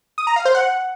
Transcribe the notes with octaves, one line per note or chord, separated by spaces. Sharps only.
D#6
A#5
F5
C5
F#5